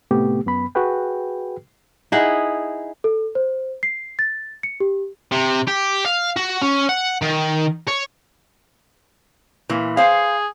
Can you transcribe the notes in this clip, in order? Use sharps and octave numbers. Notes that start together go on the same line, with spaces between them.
A2 C3 A3 B3 G4
F#2 B3 B5
F#4 G#4 B4 G5
D#4 E4 G#4 F#5
A4
C5
C7
A6
C#7
G4
C3
G4
F5
F#4
C#4
F#5
D#3
C#5
A#2 E3
G#4 C5 F5